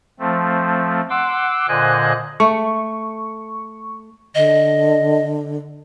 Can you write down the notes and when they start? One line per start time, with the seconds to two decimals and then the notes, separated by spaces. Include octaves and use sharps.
0.20 F3 A3 C4
1.10 F#5 C6 D6 E6
1.68 A#2 D3 C5 D#5 G#5 F#6
2.40 A3 C#6
4.35 D3 D#5